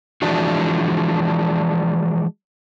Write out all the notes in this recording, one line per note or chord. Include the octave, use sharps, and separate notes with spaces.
E3 F3 G#3 D4 F#4